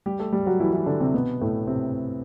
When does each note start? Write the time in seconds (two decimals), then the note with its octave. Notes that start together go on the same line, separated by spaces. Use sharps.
0.06 G3 G4
0.19 A3 A4
0.33 G3 G4
0.46 F#3 F#4
0.60 E3 E4
0.73 E3 E4
0.86 D3 D4
1.00 C3 C4
1.14 B2 B3
1.41 A2 A3
1.67 C3 C4